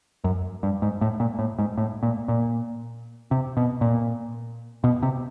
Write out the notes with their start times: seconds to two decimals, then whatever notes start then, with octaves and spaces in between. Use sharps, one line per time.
0.24 F#2
0.63 G2
0.82 G#2
1.01 A2
1.20 A#2
1.39 A2
1.59 G#2
1.78 A2
2.03 A#2
2.28 A#2
3.31 C3
3.57 B2
3.81 A#2
4.84 B2
5.03 C3